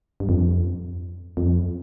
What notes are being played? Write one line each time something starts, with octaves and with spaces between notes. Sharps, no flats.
G2
F2
F2